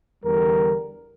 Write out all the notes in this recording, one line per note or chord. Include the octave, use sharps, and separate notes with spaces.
E2 D3 G3 A#4